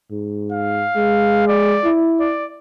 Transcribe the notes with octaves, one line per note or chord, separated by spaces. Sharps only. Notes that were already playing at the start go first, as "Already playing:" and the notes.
G#2
F5
G#3
D5
E4
D5